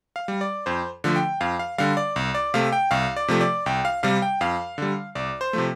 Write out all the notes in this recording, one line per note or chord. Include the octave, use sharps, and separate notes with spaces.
F5
G3
D5
F2 C5
D3 F3 A3
G5
F2 F5
F5
D3 G3 F5
D5
C2
D5
C3 A3 F5
G5
C2 F5
D5
C3 F3 A3
D5
C2 G5
F5
C3 G3 F5
G5
F2 F5
D3 G3
C2 D5
C5
C3 F3 A3